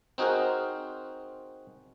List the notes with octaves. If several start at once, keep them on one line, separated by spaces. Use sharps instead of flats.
C4 D#4 F#4 G#4 A#4 C5